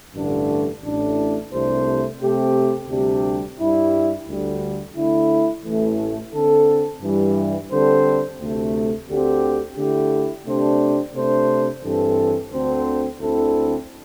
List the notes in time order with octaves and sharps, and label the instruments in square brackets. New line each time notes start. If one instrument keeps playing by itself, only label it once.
[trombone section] A1 G2 D3 A3 D4
A1 A2 A3 D4
C2 C3 A3 D4 C5
C3 A3 C4 G4
D2 C3 G3 D4 G4
G2 G3 E4
D2 D3 G3
D3 A3 E4
A1 A2 E3 A3
D3 C4 A4
G2 E3 G3 E4
D3 G3 C4 A4 C5
D2 C3 A3
D2 D3 C4 G4
D3 A3 E4 G4
C3 A3 D4 G4 C5
C3 A3 D4 C5
G2 E3 C4 A4
D2 D3 C4 A4 C5
D2 D3 C4 E4 A4